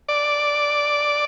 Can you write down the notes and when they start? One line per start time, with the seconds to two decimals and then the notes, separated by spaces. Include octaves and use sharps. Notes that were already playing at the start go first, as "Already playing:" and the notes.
0.08 D5